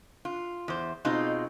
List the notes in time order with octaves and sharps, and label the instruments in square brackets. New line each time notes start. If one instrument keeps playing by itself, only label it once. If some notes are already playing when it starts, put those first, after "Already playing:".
[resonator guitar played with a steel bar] F4
E2 C5
B2 G#3 C4 D#4 F4